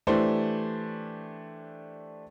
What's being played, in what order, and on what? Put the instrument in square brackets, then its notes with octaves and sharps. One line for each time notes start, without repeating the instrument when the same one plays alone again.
[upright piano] E3 A3 D4 G4 C5